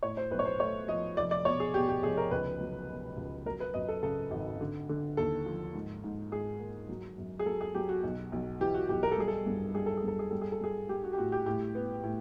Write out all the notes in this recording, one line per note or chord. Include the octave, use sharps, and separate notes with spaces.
A2 C#5
C5
B1 B4
C#5
C5
A3 C#5
F3 D#5
F1 D5
D5
B2 C#5
G#4
B2 G4
G4
F1 G#4
A#4
C#2 B4
F#3
B2
C#2
F#3 A#4
B4
F#2 D#5
A4
C#3 A4
G#1
D3
D3
D#2 A4
F3
G#2
G#2
G#2 G#4
A#3
F#3
F#2
G#4
F#3 A4
G#4
F#3 G4
F#4
B1
B1
E3 G4
F#4
B1 G4
A#4
A4
G3 G#4
A4
G2
G3 G#4
A4
G#4
G2 A4
G#4
G3 A4
G#4
A4
G3 G#4
G3 G4
F#4
G4
A2 F#4
G4
A2 G4
B3
A2